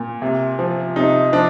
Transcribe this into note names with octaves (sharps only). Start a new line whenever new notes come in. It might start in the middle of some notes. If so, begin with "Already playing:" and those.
Already playing: A#2
C3
F3
C3 D#4
F3 D4